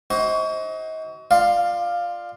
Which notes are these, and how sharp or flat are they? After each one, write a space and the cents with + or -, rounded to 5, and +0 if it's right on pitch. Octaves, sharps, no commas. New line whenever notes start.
D#4 +35 F#4 +30 C5 +25
F4 +0 D5 +25 F5 +0